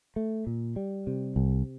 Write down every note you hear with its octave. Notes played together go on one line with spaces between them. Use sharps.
A3
A#2
G3
C3
C2